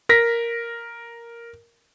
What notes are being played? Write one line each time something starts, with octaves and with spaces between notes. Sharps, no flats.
A#4 A#6 B6